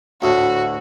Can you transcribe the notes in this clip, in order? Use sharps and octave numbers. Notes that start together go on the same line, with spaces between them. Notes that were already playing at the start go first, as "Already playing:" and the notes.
D2 A2 F#4